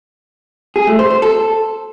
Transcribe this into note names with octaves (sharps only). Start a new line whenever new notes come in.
G#4
A3
C5
C5
A4